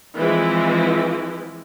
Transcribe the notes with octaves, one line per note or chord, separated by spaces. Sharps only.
E3 F3 G#3 C4 E4